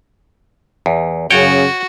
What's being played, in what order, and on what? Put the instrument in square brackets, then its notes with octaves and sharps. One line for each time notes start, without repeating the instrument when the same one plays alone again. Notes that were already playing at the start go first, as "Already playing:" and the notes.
[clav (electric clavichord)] E2
[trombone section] F#2 C#3 [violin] F#4 [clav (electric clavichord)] C#5 G5